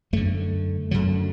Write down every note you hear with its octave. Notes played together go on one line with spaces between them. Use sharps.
F#2 D3 A3
F#2 D3 F#3